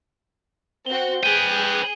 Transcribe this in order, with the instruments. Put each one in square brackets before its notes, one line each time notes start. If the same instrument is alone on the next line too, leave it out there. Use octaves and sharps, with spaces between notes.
[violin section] C4 F#4 [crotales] G7
[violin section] G#4 [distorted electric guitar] B4 G5 [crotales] D#7 F#7